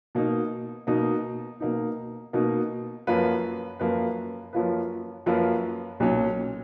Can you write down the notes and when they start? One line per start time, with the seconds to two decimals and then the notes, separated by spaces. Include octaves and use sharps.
0.15 B2 A#3 D#4
0.87 B2 A#3 D#4
1.60 B2 A#3 D#4
2.33 B2 A#3 D#4
3.07 F#2 F3 A#3 F4 B4
3.80 F#2 F3 A#3 F4 B4
4.53 F#2 F3 A#3 F4 B4
5.26 F#2 F3 A#3 F4 B4
6.00 B1 A#2 F#3 C#4